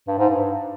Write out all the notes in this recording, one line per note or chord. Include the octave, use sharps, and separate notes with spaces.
G2
G#2
G2